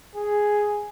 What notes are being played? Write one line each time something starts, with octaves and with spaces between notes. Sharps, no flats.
G#4